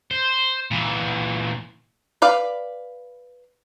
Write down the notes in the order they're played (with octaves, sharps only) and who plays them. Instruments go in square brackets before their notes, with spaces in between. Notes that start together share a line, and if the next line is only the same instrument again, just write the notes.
[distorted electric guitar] C5
A#2 E3
[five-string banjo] B4 D5 F5